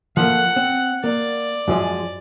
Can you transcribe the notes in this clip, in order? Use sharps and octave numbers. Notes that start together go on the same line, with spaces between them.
F3 A3 A#3 F#5
C4
A#3 D5
F#2 F3 G#3